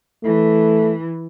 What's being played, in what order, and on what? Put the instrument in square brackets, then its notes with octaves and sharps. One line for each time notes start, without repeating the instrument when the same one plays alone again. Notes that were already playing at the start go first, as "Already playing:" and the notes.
[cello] E3 [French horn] A3